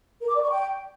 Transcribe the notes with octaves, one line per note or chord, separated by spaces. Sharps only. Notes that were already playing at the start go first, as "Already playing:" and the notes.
A#4
D6
D5
C#6
G5